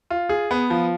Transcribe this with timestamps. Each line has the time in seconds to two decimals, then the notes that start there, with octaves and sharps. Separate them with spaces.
0.10 F4
0.29 G#4
0.51 B3
0.70 F3